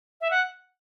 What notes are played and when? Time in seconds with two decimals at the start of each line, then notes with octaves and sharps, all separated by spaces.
0.21 E5
0.31 F#5